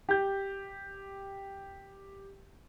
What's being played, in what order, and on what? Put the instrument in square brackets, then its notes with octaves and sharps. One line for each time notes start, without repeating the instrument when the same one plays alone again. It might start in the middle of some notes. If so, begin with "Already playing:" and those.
[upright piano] G4 G6